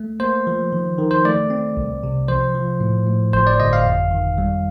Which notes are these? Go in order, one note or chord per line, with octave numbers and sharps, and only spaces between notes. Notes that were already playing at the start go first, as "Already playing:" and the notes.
Already playing: A3
A#3 C5
F3
D#3
D#3
C5
A3 D5
C4
C2
C3
F3 C5
F3
A2
A2
G1 C5
D5
G1 D#5
F5
F2
D#3
G3